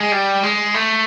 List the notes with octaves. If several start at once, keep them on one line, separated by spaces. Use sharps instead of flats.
G#3
G3
G#3
A3